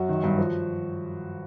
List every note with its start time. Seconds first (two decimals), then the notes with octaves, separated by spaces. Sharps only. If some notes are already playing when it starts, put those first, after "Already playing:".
Already playing: F#2 F#4 F#5
0.09 D#3
0.24 G2
0.38 F3